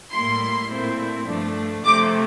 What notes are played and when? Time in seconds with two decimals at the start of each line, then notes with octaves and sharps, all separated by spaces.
0.13 A2 G3 A#3 E4 C6
0.70 A#2 A3 C4 E4
1.27 G2 F3 A3 D4
1.84 C3 F3 A3 C4 D6